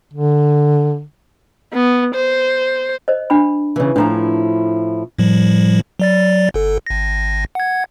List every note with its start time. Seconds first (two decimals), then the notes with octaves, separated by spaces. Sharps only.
0.13 D3
1.73 B3
2.15 C5
3.08 C5 D#5
3.30 D4 B5
3.76 C#3 E3
3.96 A2 F3 D4 E4 A#5
5.18 A2 F3 G3
6.00 F#3 D5 A6
6.54 G1 A4
6.87 G#1 A#6
7.55 F#5 G#6